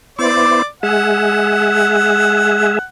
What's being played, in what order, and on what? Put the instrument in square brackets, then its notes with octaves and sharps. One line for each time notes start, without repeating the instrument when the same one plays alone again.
[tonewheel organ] B3 E4 C5 [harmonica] D5 D6
[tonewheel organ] G#3 G#4 E5 [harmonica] F#5